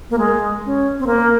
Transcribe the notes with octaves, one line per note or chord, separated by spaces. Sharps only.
A#3
G#3
C#4
C4
A#3